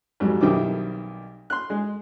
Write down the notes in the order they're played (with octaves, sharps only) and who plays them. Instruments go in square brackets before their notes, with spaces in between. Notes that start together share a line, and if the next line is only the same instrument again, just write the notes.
[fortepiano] F2 G#2 F#3 G3
B1 D#3 G3 C4 E4 D6
C6 F#6
G#3